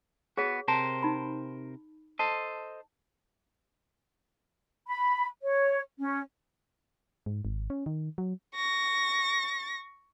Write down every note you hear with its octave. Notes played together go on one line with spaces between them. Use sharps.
B3 F#4 G#4 C#5 F#5
C3 A#4 C5 A5
D#4 B5
A4 C5 D#5 A5
B5
C#5
C#4
G#2
G#1
C#4
D#3
F#3
C#6 A#6